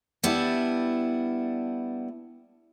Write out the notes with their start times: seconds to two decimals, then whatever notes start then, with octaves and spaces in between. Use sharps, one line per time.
0.23 G3 B3 D4 E4